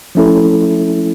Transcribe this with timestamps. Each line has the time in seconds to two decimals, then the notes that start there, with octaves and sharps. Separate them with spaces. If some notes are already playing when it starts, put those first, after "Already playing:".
0.15 F3 A3 C#4 E4 A4